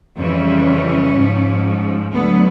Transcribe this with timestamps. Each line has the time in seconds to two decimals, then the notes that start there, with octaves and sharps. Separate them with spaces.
0.19 F2 C#3 E3 G3 C#4
1.16 G#2 F3
2.12 D2 D3 F#3 B3